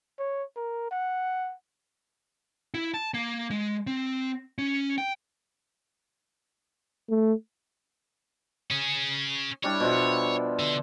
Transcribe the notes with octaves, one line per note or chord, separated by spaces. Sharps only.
C#5
A#4
F#5
E4
A5
A#3
G#3
C4
C#4
G5
A3
C#4 G#4
G3 D4 E4 C#5
B2 F3 E5
D3